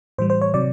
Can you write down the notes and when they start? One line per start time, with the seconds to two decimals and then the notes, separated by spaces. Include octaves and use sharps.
0.18 A2 E3 G3 C5
0.30 C5
0.42 C#5
0.54 C3 D#3 F#3 D5